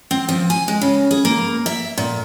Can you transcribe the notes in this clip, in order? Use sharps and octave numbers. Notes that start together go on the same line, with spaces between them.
C4
F3
G#5
G#3
C#3
G#4
A#3
E5
A#2